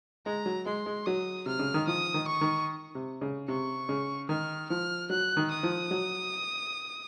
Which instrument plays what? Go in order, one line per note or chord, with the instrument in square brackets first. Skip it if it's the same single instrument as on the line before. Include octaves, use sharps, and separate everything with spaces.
[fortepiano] G#3 [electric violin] A#5
[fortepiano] F#3
[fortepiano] G#3 [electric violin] C6
[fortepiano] G#3
[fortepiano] F#3 [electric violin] D#6
[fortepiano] C3 [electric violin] F6
[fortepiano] C#3
D#3
[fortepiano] F3 [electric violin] D#6
[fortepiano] D#3
[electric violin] C#6
[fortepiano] D#3
C3
C#3
[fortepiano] C3 [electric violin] C#6
[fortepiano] C#3
[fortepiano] D#3 [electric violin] F6
[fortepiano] F3 [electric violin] F6
[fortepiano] F#3 [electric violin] F#6
[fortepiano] D#3
[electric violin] D#6
[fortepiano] F3
F#3